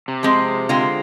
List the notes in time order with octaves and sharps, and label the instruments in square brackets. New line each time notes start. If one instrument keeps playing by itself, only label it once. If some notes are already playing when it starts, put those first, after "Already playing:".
[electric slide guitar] C3
[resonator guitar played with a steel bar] F3 G#3 C4
D3 G#3 C4 F4